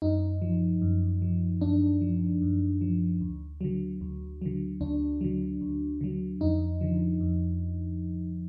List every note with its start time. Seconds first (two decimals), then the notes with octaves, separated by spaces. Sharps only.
0.02 F#2 D#4
0.42 F3
0.82 F#2
1.22 F3
1.61 F#2 D4
2.01 F3
2.42 F#2
2.81 F3
3.21 D2
3.61 D3 F#3
4.01 D2
4.41 D3 F#3
4.81 D2 D4
5.21 D3 F#3
5.61 D2
6.01 D3 F#3
6.40 F2 D#4
6.81 D3 F3
7.21 F2